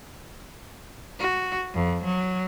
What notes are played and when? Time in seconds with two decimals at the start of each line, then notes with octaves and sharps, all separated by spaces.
1.20 F#4
1.74 F2
2.04 F#3